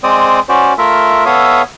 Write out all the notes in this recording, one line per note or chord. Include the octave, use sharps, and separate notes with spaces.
G#3 C4 C5 D5 D#6
C#4 F#4 C5 D5
A3 F4 A#4 E5
B3 A4 C#5 E5 F5 D#6